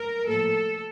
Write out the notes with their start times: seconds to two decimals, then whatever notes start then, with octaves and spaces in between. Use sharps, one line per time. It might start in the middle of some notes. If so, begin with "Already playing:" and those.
Already playing: A#4
0.27 A2 F3 A#3 A4